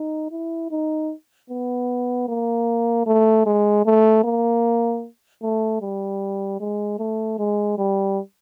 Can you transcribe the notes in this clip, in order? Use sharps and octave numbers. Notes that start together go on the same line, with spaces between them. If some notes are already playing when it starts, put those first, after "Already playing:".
Already playing: D#4
E4
D#4
B3
A#3
A3
G#3
A3
A#3
A3
G3
G#3
A3
G#3
G3